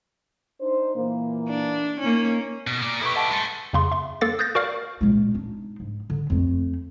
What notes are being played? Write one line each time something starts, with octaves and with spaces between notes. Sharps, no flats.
D4 D#4 C5
A#2 E3 A#3
D4
A#3 C#4 D#4
B2
A#3 D5
E4 G4 A4 B4 C#6
D#5 F#5 A5
G#3 A4 C6
F2 C#3 C6
E5 C6
A#3 A4 F5 A6
D#6 F#6 G6 A6 A#6
F#4 A#4 D5 F5 F6
A#2 G#3
D4 D#4
G#2
D3
F2 A3